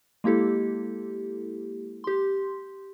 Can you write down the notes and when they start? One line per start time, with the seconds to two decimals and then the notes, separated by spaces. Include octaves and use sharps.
0.24 G#3 A#3 E4 G4 A4
2.04 G4 C6